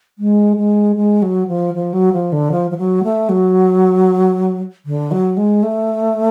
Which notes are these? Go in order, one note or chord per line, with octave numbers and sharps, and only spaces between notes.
G#3
G#3
G#3
F#3
F3
F3
F#3
F3
D3
F3
F3
F#3
A3
F#3
D3
F#3
G#3
A3